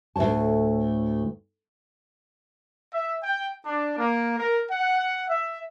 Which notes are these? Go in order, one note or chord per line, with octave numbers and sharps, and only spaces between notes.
D2 A2 C3 C#5 A5
E5
G5
D4
A#3
A#4
F#5
E5